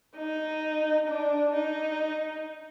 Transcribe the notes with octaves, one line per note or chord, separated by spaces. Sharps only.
D#4
D4
D#4